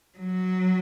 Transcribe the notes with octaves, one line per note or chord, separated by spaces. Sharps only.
F#3